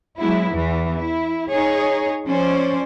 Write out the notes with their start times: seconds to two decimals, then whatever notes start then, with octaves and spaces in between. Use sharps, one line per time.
0.19 F#3 G#3 B3 E4
0.52 E2 E3
0.94 E4
1.50 D#4 G#4 C#5
2.27 F3 C#4 C5 D5